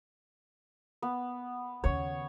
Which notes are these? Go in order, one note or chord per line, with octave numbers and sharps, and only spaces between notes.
B3
D#2 C#3 C#5